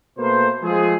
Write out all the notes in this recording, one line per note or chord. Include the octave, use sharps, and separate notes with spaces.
B2 A3 A#3 B4 C5
F3 G#3 A3 G#4